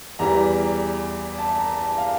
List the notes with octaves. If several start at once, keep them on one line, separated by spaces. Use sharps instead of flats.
E2 E3 G3 A#5
A5
A#5
A5
F5